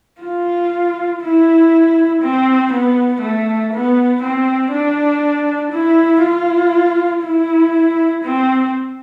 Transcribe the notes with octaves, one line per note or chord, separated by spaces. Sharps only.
F4
E4
C4
B3
A3
B3
C4
D4
E4
F4
E4
C4